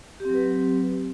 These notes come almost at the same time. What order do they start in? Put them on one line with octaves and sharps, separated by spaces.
G4 C4 F#3 B4